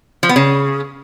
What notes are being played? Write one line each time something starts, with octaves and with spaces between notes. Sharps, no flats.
F3
B3
C#3